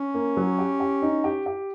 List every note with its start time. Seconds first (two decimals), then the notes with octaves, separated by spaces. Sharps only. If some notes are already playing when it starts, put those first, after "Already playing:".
Already playing: C#4
0.14 A#3
0.37 F#3
0.58 G4
0.80 G4
1.02 D#4
1.24 G4
1.46 G4